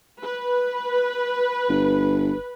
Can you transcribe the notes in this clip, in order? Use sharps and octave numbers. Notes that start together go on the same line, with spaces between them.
B4
G1